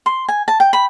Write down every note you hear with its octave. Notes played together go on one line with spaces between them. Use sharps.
C6
G#5
A5
G5
B5